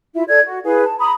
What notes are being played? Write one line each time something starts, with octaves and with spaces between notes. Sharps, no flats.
E4 F4 E5
A4 D5 G#6
F#4
E4 G#4 B4 F5
A5
A#5 B5 D#6